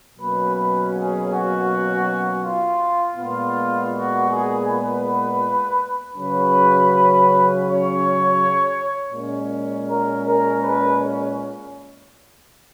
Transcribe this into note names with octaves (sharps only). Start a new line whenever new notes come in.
B2 F#3 A#3 C#4 B4
B4
G#4
F#4
F4
A#2 G#3 B3 F4
F#4
G#4
B4
C#3 F#3 C#4 B4
C#5
A#2 G#3 C#4
A#4
A#4
B4